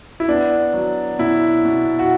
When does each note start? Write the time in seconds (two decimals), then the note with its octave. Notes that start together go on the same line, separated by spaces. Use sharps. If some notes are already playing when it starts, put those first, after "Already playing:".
0.20 E4
0.28 B3 D4
0.74 F#3
1.19 B2 E4
1.65 B2
1.99 F#4